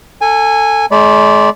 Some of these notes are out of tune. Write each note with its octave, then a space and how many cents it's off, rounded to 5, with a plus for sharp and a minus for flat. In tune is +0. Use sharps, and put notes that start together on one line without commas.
A4 +20 G#5 -10
G#3 +40 D5 -20 B5 -10